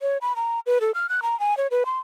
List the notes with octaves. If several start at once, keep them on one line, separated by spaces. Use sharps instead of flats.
C#5
B5
A#5
B4
A4
F6
F#6
A#5
G#5
C#5
B4
C6